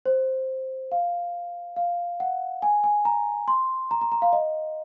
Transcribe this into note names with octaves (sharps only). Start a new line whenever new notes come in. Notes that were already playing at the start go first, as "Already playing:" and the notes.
C5
F5
F5
F#5
G#5
G#5
A#5
C6
A#5
A#5
A#5
F5
D#5